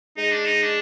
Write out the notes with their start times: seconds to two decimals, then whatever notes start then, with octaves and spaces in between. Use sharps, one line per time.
0.17 G#3 D#4
0.31 D4
0.45 D#4
0.62 D4